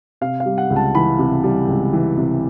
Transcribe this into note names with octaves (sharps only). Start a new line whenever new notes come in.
C3 F5
F5
G3
F#5
C#2
A5
E3 B5
C3
G3
C#2
E3
C3